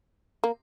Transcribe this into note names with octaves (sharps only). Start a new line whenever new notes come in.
A#3